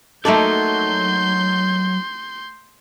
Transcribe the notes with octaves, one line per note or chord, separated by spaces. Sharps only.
F#3 A3 A#3 D#4 A4 D5 C6 G6